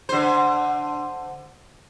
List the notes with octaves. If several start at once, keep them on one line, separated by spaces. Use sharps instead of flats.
D3 C5